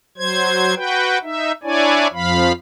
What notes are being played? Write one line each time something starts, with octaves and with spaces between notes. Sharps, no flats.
F#3 C5 G#6
F#4 B4 G5
D#4 E5
D4 E4 C#5 D5 G#5
F2 F3 F5 B5